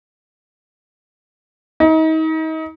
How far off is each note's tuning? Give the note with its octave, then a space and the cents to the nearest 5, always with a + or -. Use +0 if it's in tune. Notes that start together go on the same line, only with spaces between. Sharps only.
D#4 +35